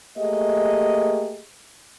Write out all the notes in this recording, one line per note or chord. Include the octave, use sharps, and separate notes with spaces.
A3 A#3 G4 G#4 D#5